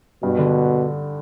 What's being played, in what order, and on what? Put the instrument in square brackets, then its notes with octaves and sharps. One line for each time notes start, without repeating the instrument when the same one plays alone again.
[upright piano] G2 [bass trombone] B2
[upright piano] D3